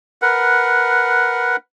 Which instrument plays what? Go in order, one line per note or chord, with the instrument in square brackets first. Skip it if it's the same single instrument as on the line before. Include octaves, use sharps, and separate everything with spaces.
[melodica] A#4 B4 F#5